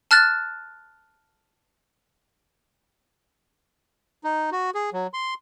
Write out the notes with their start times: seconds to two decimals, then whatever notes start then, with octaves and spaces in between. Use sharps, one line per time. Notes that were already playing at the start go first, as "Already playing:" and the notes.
0.11 A5 F6 F#6 A6
4.24 D#4
4.52 F#4
4.75 G#4
4.93 F#3
5.13 C6